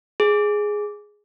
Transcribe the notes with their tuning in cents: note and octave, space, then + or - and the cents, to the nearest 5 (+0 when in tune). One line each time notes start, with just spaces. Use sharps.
G#4 +0